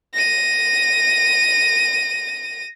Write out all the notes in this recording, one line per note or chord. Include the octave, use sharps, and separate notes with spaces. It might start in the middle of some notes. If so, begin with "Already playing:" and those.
A#6 D#7